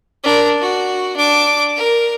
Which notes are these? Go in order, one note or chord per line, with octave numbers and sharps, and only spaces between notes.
D4 A#4
F#4
D4 D6
A#4